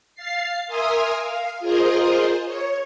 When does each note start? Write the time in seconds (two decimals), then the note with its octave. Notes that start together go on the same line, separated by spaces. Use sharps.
0.15 F5 A6 C7
0.67 A#4 E5 G#5 C6 D#6 F6
1.17 F5
1.60 F4 G#4 A#4 C5 D#5
2.45 C#5